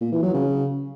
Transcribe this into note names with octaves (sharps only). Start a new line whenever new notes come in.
A#2
E3
F#3
C#3